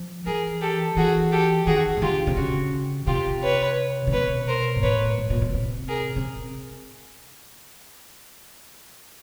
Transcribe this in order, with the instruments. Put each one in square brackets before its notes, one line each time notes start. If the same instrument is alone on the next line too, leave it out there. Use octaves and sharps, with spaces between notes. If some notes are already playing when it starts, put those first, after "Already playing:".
Already playing: [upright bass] F3
[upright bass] E3 [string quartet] G#4 A#4
[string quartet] G4 A4
[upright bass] E3 [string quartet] F#4 G#4
[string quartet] G4 A4
[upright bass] D#3 [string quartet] F#4 G#4
[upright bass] C#3
[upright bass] D3 [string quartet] F4 G4
[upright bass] C3
[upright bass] C#3 [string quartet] F#4
[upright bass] C3 [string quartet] F4 G4
[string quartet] B4 C#5
[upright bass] C3
[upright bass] B2 [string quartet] B4 C#5
[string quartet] A#4 C5
[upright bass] G#2
[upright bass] A2 [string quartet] B4 C#5
[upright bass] A2
A#2
B2
C3
[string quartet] G#4 A#4
[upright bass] C3